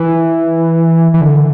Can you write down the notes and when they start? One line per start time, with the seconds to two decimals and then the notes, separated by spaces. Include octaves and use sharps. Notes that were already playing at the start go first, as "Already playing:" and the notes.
Already playing: E3
1.14 E3
1.21 D3